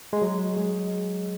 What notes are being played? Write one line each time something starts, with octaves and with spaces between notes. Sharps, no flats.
G#3
F#3
G#3